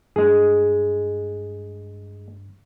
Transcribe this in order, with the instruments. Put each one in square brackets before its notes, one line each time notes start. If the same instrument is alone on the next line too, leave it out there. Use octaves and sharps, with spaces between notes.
[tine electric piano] G2 [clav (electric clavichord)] G#3 G#4